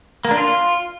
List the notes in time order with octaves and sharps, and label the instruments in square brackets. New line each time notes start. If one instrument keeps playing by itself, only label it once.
[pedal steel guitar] A#3
D4
F4